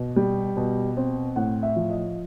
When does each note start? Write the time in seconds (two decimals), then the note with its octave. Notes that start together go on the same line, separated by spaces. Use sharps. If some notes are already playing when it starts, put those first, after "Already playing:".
Already playing: B2
0.16 G3
0.57 B2
0.97 C4
1.36 A2 F#5
1.63 E5
1.76 F3
1.90 D#5